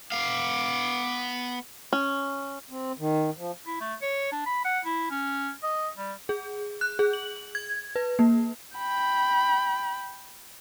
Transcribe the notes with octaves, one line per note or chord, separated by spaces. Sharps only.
B3 F5 D6
C#4
C4
D#3
F3
E4
A3
C#5
D4
B5
F#5
E4
C#4
D#5
G3
G#4
F#6
G#4
F#7
G#6
B4
A#3
G5 B5